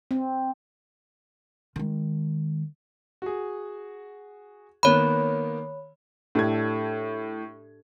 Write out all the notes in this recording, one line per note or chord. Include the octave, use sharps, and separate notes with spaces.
C4
D#3 G#3
F#4 G#4
D#3 A#3 B3 C#5 B5
A2 D4 G4 A4 G#6